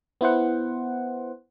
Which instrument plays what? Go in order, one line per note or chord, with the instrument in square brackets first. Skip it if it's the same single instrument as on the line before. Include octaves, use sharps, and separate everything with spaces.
[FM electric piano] B3 E4 C5 F#5